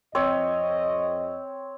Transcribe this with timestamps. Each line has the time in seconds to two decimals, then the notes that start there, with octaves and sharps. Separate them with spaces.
0.15 F2 C4 C#5 D#5